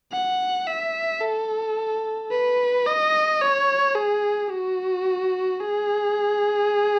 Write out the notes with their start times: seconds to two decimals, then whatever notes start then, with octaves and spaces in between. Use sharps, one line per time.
0.12 F#5
0.67 E5
1.21 A4
2.31 B4
2.86 D#5
3.41 C#5
3.95 G#4
4.50 F#4
5.60 G#4